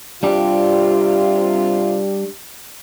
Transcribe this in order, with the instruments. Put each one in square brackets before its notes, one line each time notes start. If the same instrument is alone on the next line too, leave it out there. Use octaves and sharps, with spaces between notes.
[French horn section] C3 F4 [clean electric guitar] G3 D4 G4